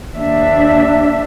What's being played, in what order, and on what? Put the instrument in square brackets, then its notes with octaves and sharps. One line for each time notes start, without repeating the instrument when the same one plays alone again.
[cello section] D#2 D4 E5